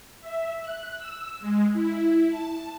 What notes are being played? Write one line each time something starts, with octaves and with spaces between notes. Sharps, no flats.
E5
F#6
E6
G#3
E4
A5